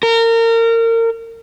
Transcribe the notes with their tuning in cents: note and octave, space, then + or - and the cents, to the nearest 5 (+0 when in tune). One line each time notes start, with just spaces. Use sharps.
A#4 -30